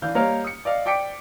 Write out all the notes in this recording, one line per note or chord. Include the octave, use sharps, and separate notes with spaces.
E3 D4 F5 G6
G3 A#3 A#4 C#5 D#5 F5
D#6 C#7
D5 D#5 F5
D5 G5 D6 B6 C#7 D7